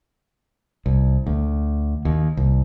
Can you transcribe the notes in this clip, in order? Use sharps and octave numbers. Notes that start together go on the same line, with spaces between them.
C2
D2
D#2
C2